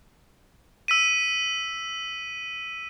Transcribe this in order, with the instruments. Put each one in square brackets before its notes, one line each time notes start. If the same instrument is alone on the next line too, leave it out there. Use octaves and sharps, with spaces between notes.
[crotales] E6 B6 D#7